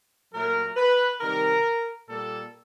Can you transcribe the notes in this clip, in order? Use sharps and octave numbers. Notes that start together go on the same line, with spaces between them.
A#2 F#3 A3 A#4
B4
C3 D#3 G3 A#4
A#2 G3 A#3 A4